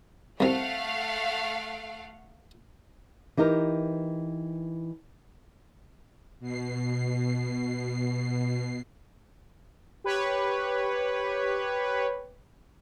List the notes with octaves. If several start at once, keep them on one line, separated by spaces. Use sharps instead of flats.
C2 C3 A3 F5 F#5
E3 D#4 G4 A#4
B2 C7
G4 B4 C#5